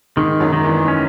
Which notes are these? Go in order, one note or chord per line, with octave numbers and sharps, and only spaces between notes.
G#2 D#3 G#3
F#2 F#3
D#3
E2 E3
C#4